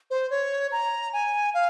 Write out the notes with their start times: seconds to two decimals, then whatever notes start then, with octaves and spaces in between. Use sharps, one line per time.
0.10 C5
0.30 C#5
0.72 A#5
1.13 G#5
1.54 F5